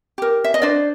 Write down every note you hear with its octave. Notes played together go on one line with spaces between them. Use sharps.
G4 A#4
E5
D#5
D4 C5 D5